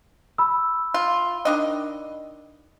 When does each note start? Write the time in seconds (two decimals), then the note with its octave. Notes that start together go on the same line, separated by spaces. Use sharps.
0.38 B5 E6
0.94 F4
1.45 D#3 D4 D#5